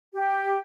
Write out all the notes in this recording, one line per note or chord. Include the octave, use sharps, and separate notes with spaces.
G4